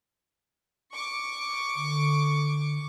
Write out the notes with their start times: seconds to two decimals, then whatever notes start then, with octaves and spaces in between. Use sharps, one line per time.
0.93 C#6 D6
1.76 D3